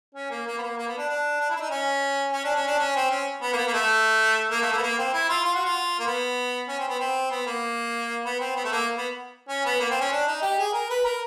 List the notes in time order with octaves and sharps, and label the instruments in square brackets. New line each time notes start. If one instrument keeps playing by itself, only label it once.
[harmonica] C#4
A#3
A#3
B3
A#3
A#3
B3
D4
D4
D4
E4
D4
D#4
C#4
C#4
D4
C#4
D4
C#4
C4
C#4
B3
A#3
B3
A#3
A3
A#3
A3
A#3
B3
A#3
C4
E4
F4
F4
F#4
F4
A#3
B3
C#4
C4
B3
C4
B3
A#3
B3
C4
B3
A3
A#3
B3
C#4
B3
A#3
C4
C#4
D4
D#4
G4
G#4
A#4
B4
A#4